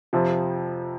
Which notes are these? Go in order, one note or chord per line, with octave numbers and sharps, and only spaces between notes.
F2 C3 F3